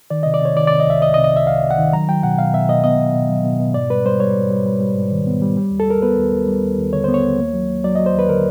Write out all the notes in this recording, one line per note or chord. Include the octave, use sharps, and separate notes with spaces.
D#3 D5
C3 D#5
D5
C3 C#5
D#3 D5
C3 D5
D#5
C2 E5
C2 D#5
D#5
C3
D#5
C2 E5
C2 F5
C3
F#5
D#3
F#3 A#5
F#3 G5
B2 F#5
B2 F5
B2 E5
B2 D#5
B3 D#5
B2
B2
F#3
B2
B2
G#2 D5
G3 B4
G3 C5
G3 C#5
G#2
G3
G3
G3
G#2
D#3
B3
G3
G3
D#2
A4
D#2 A#4
B3 B4
D#2
D#2
G3
D#2
D#2
D3 C#5
B3 C5
C#5
D#2
A#3
F#3
A#3
F#3 D5
F#3 D#5
C5
D#2 B4
D3 A#4